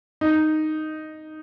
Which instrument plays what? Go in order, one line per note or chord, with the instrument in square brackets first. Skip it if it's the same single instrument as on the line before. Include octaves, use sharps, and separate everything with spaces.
[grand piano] D#4